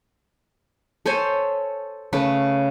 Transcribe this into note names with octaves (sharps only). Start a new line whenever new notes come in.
A4 C5 C#5 G#5
C#3 A3 B4